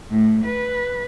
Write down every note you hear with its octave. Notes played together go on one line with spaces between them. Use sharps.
A2
B4